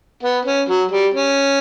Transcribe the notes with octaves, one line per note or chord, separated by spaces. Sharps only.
B3
C#4
F#3
G3
C#4